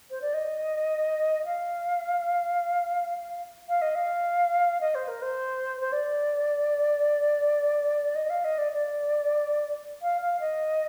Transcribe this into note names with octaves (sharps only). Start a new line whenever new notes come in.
C5
D5
D#5
F5
F5
D#5
F5
D#5
C5
A#4
C5
C5
D5
D#5
F5
D#5
D5
D5
F5
F5
D#5